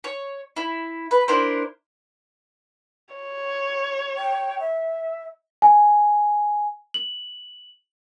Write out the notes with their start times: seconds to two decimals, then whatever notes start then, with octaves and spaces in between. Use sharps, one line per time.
0.04 C#5
0.57 E4
1.11 B4
1.28 D4 E4 A#4 C5
3.15 C#5
4.17 G5
4.60 E5
5.62 G#5
6.94 F#7